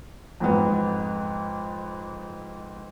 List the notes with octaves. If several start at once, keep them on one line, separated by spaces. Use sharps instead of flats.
F2 G#2 B3